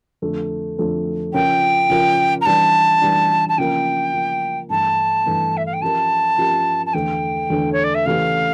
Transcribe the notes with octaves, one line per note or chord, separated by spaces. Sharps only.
F2 D3 A3
F2 D3 A3
C#3 F3 C#4 F4 A#4 G5
C#3 F3 C#4 F4 A#4
A#5
E3 G3 D4 A5
E3 G3 D4
A5
C#3 F3 A#3 G5
C#3 F3 A#3
G2 E3 A3 A5
G2 E3 A3
E5
F5
G5
F3 C#4 G4 A#4 A5
F3 C#4 G4 A#4
A5
E2 D3 A3 G5
E2 D3 A3
C#5
D5
E5
C#3 E3 A3 C#4 G4 F5